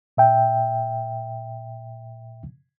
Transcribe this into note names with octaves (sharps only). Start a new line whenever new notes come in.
A#2 E5 G5